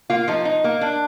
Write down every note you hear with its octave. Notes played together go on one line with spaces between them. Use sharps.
A#3 F4
F3 D#4
D#4
A#3
D4